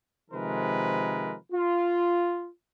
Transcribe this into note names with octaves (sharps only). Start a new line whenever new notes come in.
C3 D#3 F3 G#3 A#4 B4
F4